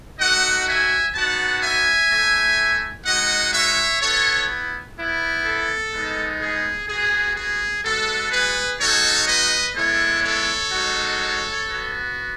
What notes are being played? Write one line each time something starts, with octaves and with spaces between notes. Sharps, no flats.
A3 D#4 F#4 D#5 F#5
E5 G#5
B3 D#4 F#4 F#5 A5
E5 G#5
A3 E4
G#3 D#4 F#4 D#5 F#5
C#5 E5
B3 E4 A4 C#5
B3 E4
A4
G#3 B3 D#4
G#4
B3 F#4 G#4
G#4
G#3 B3 F#4 A4
G#4 B4
G#3 D#4 F#4 A4 C#5
B4 D#5
G#3 B3 E4 A4 C#5
A4 C#5
G#3 D#4 F#4
B3 F#4